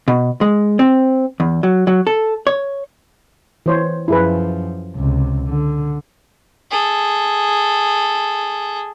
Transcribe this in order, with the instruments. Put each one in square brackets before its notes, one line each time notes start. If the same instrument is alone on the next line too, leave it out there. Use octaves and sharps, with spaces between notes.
[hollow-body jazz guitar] B2
G#3
C4
E2
F#3
F#3
A4
C#5
[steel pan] E3 C5 C#5
[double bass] F#2 F3 [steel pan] E4 G#4 B4
[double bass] C#2 C3
D3
[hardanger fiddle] G#4 A4